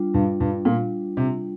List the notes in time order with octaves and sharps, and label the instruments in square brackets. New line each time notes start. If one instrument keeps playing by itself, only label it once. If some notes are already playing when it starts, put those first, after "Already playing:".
Already playing: [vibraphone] G3 D4 F4
[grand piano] G2
G2
A#2
C3